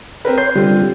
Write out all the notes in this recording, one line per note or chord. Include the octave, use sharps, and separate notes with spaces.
C4 A#4 B4
C#5 C6 G6
D3 G3 C4 F4